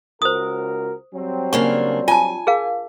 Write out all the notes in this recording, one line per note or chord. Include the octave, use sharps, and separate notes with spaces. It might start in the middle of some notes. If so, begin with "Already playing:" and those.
C#2 F#4 A#4 C5 D#6
F#3 G3 C4
C#3 A#3 D4 C#6
F4 G#5 A5
G#4 A#4 F5